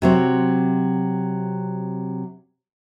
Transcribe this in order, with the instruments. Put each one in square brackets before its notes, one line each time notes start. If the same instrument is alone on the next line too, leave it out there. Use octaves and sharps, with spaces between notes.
[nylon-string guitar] C3 F#3 C4